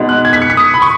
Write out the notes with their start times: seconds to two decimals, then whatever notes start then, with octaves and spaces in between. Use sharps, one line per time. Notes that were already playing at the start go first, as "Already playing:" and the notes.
Already playing: B2 G#3 B3 D#4
0.09 F#6
0.25 G#6
0.33 B6
0.42 C#7
0.50 B6
0.57 D#6
0.74 B5
0.82 C#6